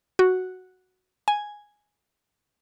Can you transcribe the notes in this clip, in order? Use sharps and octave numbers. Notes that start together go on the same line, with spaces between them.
F#4
G#5